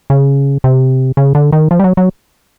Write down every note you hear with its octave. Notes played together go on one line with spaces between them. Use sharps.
C#3
C3
C#3
D3
D#3
F3
G3
F#3
F#3